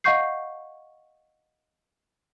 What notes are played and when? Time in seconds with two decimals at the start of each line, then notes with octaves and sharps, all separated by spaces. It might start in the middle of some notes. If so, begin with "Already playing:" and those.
0.04 D#5 F5 F#5 C#6 G6 C7